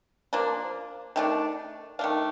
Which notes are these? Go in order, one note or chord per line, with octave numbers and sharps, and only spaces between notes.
F3 A#3 D4
D#3 A3 D4
D#3 A3 D4 F5